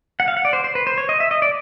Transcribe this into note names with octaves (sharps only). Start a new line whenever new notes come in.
F#5
F5
F#5
D5
C5
C5
B4
C5
C#5
D#5
E5
D#5
D5